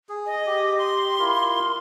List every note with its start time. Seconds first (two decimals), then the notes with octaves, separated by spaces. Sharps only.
0.09 G#4
0.26 D#5
0.46 G4
0.78 C6
1.19 E4 F4 A#4